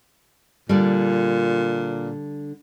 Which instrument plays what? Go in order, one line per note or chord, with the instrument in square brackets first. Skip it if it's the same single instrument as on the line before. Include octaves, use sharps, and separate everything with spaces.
[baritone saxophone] A#2 [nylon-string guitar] D3 G3